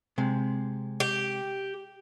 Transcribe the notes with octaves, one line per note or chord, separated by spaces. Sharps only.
C3 G#3
G4